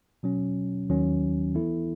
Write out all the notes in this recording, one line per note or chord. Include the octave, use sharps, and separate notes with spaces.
B2 F#3 C#4
D#2 D#3 F#3 C#4
E3 B3 E4 A4